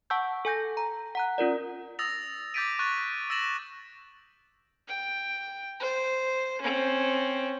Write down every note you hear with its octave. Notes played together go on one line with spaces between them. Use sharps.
F#5 A5 C#6 E6 G6
A4 G#5 G6 A#6
A#5
F#5 A#5 F#6
C#4 F4 A#4 D5
D#6 E6 A6 A#6 F7
D6 G6 A6 B6 D7 D#7
C#6 F#6 A6 D#7
E6 A6 A#6 E7 F#7
G5
C5
C4 C#4